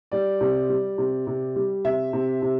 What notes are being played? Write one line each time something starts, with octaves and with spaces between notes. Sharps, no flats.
G3 D5
C3
G3
C3
C3
G3
C3 E5
C3
C3